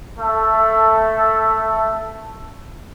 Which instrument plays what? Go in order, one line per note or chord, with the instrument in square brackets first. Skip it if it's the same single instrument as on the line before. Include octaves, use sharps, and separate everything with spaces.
[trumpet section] A3 A4 E5